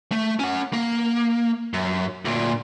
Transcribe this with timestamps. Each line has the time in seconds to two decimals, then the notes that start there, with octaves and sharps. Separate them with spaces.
0.12 A3
0.39 C#4 F#5
0.73 A#3
1.74 F#2
2.25 D2 A#2